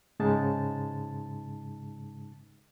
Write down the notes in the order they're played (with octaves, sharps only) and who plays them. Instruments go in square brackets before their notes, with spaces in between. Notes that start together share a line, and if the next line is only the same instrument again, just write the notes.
[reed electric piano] G#2 C#3 G#3 D#4 A5